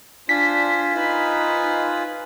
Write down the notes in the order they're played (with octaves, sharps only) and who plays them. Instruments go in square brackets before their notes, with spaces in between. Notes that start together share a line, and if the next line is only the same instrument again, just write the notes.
[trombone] D4 [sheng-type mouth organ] F4 G#5 [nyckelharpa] C5 [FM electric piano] B6
[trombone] D#4 [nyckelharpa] B4 C5